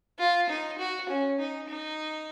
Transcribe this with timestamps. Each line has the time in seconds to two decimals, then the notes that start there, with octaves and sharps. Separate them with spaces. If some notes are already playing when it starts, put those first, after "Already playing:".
0.19 F4
0.49 D#4
0.78 F#4
1.09 C#4
1.39 D#4
1.69 D#4